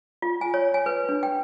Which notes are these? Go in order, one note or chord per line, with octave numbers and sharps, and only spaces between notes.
F4
G#5
C#5
G#5
B4
D4
G5